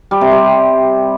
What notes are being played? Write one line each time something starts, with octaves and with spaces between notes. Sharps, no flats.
G3
C3
G3